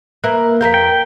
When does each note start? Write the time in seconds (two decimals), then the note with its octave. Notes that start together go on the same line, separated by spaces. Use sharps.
0.24 A#3 B4 E5 F#6
0.61 F2 A#4 F5 G6 B6
0.74 G5